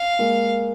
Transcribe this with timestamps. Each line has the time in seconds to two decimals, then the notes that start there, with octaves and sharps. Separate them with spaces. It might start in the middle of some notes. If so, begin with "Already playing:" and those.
Already playing: F5
0.19 G#3 A#3